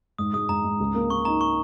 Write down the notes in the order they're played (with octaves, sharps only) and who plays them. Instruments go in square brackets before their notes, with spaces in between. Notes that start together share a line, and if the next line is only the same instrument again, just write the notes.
[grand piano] G#2 [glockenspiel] D#6
[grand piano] G#3 [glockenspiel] D#6
[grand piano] G#2 [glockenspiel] A#5
[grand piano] G#2
C#2
A#3
[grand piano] A#3 [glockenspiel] C#6
[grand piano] D#4 [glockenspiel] A#5
[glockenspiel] C#6